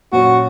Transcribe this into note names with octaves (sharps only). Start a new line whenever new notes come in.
A#2 F#3 C#4 F#4